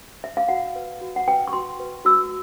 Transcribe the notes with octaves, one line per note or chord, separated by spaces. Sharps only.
E5
F5
F#4 F#5
B4
F#4
F#5
B4 G5
C#6
F#4 C6
B4
F#4 E6